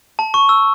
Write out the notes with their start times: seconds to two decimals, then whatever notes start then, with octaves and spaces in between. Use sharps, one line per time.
0.19 A5
0.34 C#6
0.49 E6